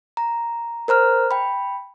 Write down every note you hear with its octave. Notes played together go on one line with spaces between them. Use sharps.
A#5
A#4 C5 A#5 F6
G5 B5